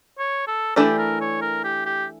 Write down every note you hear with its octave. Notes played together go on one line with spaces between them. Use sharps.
C#5
A4
E3 A3 D4 G4 A4 D5
A#4
C#5
A#4
G4
G4